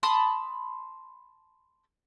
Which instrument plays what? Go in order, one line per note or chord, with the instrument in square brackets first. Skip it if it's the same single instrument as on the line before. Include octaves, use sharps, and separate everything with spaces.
[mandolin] A5 B5 C6 D#6